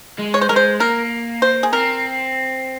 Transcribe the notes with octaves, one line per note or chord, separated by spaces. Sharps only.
G#3
C#5
C5
G#3 A#4
C5
A#3 A#4
C5
G#4
C4 A#4